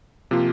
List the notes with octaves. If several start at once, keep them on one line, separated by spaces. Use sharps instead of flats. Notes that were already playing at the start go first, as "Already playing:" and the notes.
C3 F3 A#3 F4